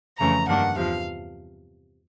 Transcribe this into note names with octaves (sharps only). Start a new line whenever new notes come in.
F2 C#3 E3 A3 C#4 A#5
G2 D#3 G3 A#3 D4 F#5
E2 C3 F3 F5